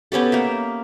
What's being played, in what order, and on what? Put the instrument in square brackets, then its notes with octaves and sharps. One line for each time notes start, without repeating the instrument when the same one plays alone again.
[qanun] B3 C#4 G4 A4
A#3 A#4 E5